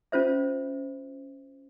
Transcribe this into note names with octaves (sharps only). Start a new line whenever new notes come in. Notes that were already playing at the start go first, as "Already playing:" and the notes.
C#4 F4 C5 E5